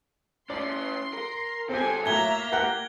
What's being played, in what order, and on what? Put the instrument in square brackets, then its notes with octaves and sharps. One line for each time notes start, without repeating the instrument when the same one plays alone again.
[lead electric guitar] C#4 E4 [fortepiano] D5 [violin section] C6
[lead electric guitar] A#4
[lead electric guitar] D#2 A4 [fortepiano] C4 G4 [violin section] C5 G#5
[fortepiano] A2 F#3 [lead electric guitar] A#3 [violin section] E5 A#5 [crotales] G#6 G7
[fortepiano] G4 A#4 F#5